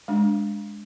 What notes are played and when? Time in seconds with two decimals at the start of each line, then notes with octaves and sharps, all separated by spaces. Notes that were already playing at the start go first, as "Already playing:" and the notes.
0.08 G#3 D4